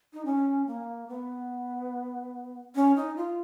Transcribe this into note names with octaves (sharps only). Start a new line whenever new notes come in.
D#4
C#4
A#3
B3
C#4
D#4
F4